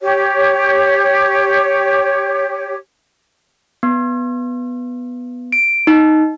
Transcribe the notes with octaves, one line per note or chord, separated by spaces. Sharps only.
G4 C#5
B3
D7
D#4